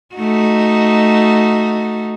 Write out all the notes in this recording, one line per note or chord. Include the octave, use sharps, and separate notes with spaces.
A3 D#4 F#4